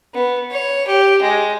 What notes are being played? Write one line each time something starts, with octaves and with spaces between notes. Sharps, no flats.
B3
C#5
G4
G#3